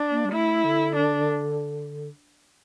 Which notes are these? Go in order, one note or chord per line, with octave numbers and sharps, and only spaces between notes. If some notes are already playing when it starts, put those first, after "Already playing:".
Already playing: D4
A#3
G3
A3 E4
D3
D4